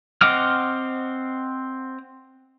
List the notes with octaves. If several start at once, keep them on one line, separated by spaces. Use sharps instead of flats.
C4 D#5 F#5 D6 F6